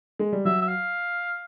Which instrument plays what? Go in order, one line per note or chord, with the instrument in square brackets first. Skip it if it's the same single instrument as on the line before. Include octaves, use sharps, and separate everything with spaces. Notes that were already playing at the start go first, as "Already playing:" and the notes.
[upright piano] G#3
G3
[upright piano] F#3 [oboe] E5
[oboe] E5
F5